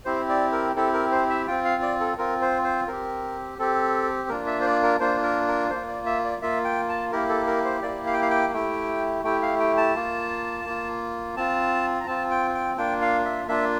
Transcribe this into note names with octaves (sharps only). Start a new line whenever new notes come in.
C4 E4 G4 C5
D5
A#4
C4 E4 G4 A4
A#4
C5
E5
C4 F4 G5
F5
D5
A4
C4 F4 A#4
C5
C5
C4 G4 A#4
C4 G4 A4
A#3 D4 F4 A#4
E5
C5
D5
A#4
A#3 D4 F4 C5
A#4
A#4
A#3 F4 C5
D5
E5
D5
A#3 F4 E5
G5
A5
A#3 E4 G4 A#4
A4
A#4
C5
A#3 E4 G4 D5
F5
G5
F5
G5
A3 E4 G4 G5
A3 E4 G4 G5
F5
G5
A5
A#3 F4
A#3 F4
C4 F4 A5
A#5
C4 F4 A5
G5
G5
A#3 D4 F4 G5
F5
E5
A#3 D4 F4 E5